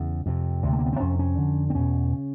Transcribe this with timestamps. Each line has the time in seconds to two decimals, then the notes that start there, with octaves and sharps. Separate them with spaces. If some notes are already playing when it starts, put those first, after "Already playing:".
Already playing: E2 C#3
0.26 F2 C3
0.63 D2 C3
0.73 A3
0.79 A#3
0.86 B3
0.93 C4
1.00 F2 C3 C#4
1.19 C#4
1.37 F2 D3
1.70 C4
1.74 E2 B2 C#4
2.12 C#3